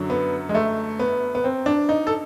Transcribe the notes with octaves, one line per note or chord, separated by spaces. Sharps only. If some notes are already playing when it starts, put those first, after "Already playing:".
Already playing: F#2 D3 F#3
B3
G#3
A3
B3
B3
C4
D4
D#4
A4